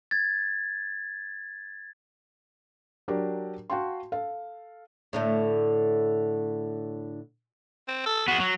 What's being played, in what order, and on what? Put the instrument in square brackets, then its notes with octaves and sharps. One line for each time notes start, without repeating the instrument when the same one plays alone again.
[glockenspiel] G#6 A6
[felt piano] F#3 D4 G4 A#4 D5
F#4 F5 G5 A5 C6
A4 F5
[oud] A2 D3 A3
[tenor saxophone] C4
A4
[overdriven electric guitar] B3 G#4 [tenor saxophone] F#4
[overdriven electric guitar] F#3